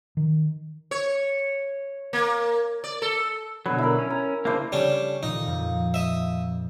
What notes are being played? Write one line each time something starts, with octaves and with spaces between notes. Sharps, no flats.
D#3
C#5
A#3
D5
A4
B2 D3 F#3 B4
E4 A#4
C#4
A#5
C#3 A#3 D4 E4 C5
C#3 G3 C#4 D4 A4 G5
A#2 D#3 D#4
F2 A#2
D#5 E5